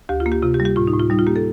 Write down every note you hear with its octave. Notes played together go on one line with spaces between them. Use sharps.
D2 G4
F4
A#3
G4
C3 F4
G4
G3
G4
A2 F4
D#4
A2
F4
G3 D#4
F4
A#3 G4
A4